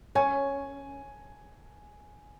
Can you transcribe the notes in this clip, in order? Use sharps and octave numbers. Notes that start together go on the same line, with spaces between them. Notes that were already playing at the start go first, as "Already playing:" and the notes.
C#4 G#5